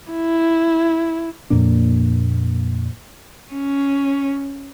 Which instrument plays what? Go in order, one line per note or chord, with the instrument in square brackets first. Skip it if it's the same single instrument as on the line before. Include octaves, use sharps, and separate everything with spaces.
[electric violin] E4
[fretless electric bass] F2 A#2 A#3 D4
[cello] C#4